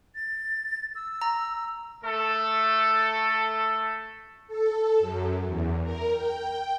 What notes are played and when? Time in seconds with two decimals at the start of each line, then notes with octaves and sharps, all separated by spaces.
0.15 A6
0.95 E6
1.21 A#5
2.03 A3 A4
4.47 A4
5.00 F#2
5.45 E2
5.83 A#4
6.12 G5